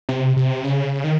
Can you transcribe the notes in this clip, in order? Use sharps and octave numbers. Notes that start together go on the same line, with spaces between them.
C3
C3
C#3
D#3